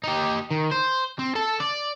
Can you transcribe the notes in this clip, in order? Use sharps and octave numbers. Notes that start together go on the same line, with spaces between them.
D#4 G4
D#3
C5
C4
A4 A5
D5